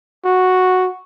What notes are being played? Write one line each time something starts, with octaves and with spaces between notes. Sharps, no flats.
F#4